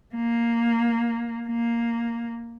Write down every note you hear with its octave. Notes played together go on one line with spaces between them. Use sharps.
A#3
A#3